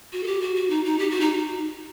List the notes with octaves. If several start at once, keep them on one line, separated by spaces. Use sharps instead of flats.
F#4
A4
G4
F#4
F#4
D#4
D#4
G4
F#4
D#4